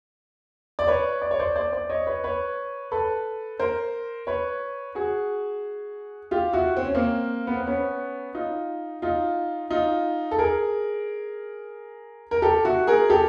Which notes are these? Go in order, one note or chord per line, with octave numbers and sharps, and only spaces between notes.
D5
B4 C#5
D5
C#5
C5 D5
C5 D5
C5 D5
C#5 D#5
B4 C#5
B4 C#5
A4 B4
A#4 C5
B4 C#5
F#4 G#4
F4 G4
E4 F#4
C4
C#4
A#3 C4
B3
C4
B3 C#4
D#4 F4
D#4 F4
D#4 F4
A4
G#4 A#4
A#4
G4 A4
E4 F#4
G#4 A#4
G4 A4